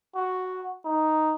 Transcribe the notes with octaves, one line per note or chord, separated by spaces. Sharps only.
F#4
D#4